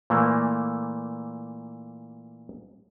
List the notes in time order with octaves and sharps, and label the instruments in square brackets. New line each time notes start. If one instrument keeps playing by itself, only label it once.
[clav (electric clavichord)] A#2 E3 A3 A#3